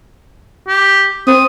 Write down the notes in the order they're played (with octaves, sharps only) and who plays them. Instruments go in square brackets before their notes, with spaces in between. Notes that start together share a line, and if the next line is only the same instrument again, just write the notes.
[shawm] G4
[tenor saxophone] C4 [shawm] D#6